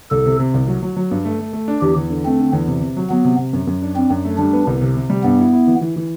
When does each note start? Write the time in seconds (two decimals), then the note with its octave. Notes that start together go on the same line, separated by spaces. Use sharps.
0.11 C2 A4
0.26 C3
0.39 C3
0.54 C2
0.68 F#3
0.82 F#3
0.96 F#3
1.11 G2
1.25 A3
1.39 A3
1.53 A3
1.68 D4
1.81 E2 G4
1.97 E2
2.10 D3
2.25 A3 C4
2.40 D3
2.53 E2
2.68 C3
2.81 C3
2.97 F#3
3.10 F#3 B3
3.25 C3
3.38 C3
3.53 F#2
3.67 F#2
3.82 D4
3.96 C4 D4
4.10 F#2
4.25 A3
4.38 G3 D4
4.53 B3
4.67 C2
4.81 C3
4.96 C3
5.10 G3
5.24 G2 B3
5.39 E4
5.53 E4
5.67 E3
5.81 E3
5.96 E3